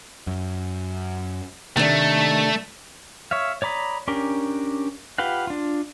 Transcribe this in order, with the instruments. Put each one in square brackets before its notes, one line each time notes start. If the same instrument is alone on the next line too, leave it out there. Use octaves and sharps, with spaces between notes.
[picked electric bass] F#2
[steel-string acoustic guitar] C3 D4 [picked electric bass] D#3 [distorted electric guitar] A3
[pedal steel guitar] C#5 E5 F5
C#5 D5 A#5 B5 D#6
C#4 D4 G4 A#4
F4 G4 B4 F5 F#5
D4 F4